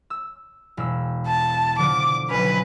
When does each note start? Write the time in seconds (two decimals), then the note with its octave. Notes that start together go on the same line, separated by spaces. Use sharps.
0.10 E6
0.77 E1 E6
1.27 A5
1.78 D3 F3 D6
2.30 B1 C#4 B4